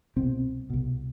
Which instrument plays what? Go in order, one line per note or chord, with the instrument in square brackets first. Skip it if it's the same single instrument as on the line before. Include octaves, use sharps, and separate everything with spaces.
[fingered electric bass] C2 B2 C4
C2 B2